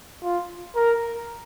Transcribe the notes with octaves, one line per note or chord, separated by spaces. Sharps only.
F4
A#4